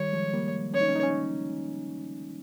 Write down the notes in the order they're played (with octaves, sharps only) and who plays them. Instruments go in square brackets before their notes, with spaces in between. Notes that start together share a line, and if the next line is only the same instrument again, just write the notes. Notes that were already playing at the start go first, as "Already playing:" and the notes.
Already playing: [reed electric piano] D#3 G3 [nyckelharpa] C#5
[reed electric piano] F3 G#3
G3 A#3
[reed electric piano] C#4 [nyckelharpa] C#5
[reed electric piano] D#4
C#4
D#4
C#4
D#4